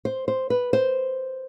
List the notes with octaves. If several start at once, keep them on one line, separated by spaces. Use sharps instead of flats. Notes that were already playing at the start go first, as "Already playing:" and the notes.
C5
C5
B4
C5